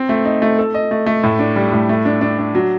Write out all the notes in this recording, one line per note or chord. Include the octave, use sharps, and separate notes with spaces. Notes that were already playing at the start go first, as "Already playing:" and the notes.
Already playing: C4
A3
D#4
A3
A4
D#5
A3
A3
A2
D4
G3
A2
A3
D4
D4
D4
F#3